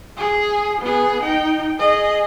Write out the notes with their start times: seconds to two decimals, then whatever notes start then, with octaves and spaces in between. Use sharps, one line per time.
0.17 G#4
0.81 B3 G#4
1.22 D#4 G5
1.79 G#4 D#5